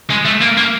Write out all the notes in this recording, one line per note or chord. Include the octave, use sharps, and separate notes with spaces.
G#3
A3
A#3
A#3